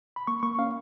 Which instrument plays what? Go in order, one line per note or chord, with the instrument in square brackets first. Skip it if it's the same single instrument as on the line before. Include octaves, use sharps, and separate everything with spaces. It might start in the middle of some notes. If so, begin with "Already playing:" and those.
[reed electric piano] B5
A#3 C#6
A#3 C#6
C#4 F5